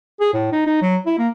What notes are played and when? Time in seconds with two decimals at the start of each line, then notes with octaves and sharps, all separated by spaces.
0.21 G#4
0.33 A2
0.52 D#4
0.66 D#4
0.82 F#3
1.06 E4
1.18 A#3